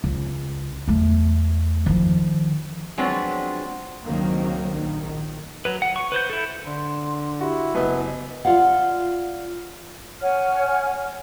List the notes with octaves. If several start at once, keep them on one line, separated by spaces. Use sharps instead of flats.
C#2
E2 A3
D#3 F3
F3 F#3 G#3 B3 C4 D4
C#2 G2 D#3 F#3 A#3 C4
A#1 D#3
F#3 B4
F#5
C#6
B4 C5 G6
E4 A4
D3 C6
E4 F#4 G4
F#1 B3 D#5
F4 D5 F5 F#5
C#5 F#5 G#5 F6